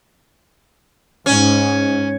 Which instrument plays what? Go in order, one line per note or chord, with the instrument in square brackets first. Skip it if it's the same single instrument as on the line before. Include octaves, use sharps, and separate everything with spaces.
[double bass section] G#2 [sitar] C#4